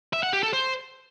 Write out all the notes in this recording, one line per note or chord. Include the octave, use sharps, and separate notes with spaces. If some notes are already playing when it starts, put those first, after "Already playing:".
E5
F#5
G4
A4
C5